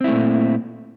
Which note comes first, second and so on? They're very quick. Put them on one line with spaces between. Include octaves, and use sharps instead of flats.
C4 E4 A3 A#2